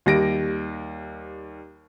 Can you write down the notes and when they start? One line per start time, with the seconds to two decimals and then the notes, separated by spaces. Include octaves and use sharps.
0.06 D#2 G3 A#6 D7